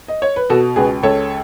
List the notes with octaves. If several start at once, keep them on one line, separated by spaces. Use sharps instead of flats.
D#5
C#5
B4
B2 F#4 A4
C#2 G#4 B4
C#2 A4 C#5